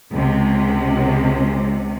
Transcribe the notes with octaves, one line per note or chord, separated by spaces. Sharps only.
C#2 C3